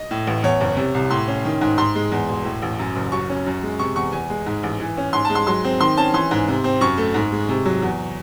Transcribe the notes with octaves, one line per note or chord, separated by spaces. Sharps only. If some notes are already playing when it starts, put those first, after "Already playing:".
Already playing: D#5
A2
A1
E2 C#5
F#1
C3
C2
A2 C6
C#4
D#3
G#2
G#2 C6
G#3
E2
E1
A2
A1
F#2
F#1
F#3 C#6
C#4
F#2
G#3
C3 C#6
E2 C#6
E2 G#5
G#3
G#2
A1
E3
C#4
G#2 C6
A5
G#3
C6
F#3 C6
C4
D#3 C6
C#4 A5
E3 C6
G#2
C3
C4
F#2 C#6
A3
G#2
G#3
C3
F#3
E2